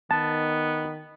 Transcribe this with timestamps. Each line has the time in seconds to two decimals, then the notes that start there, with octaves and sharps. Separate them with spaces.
0.11 D#3 B3 A5